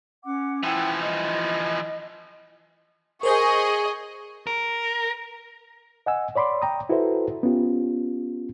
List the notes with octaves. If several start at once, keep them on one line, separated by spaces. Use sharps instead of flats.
C#4 F#5 D6
E3 F3 E4 F#5 G5
D#5
G#4 A#4 C5 D#5 C#6 G6
A#4
D#5 F#5 G#5 E6
C#5 D5 B5 C6 D6
G5 A#5 D#6
E4 F#4 A4 B4 C5 E5
B3 C#4 F4 G4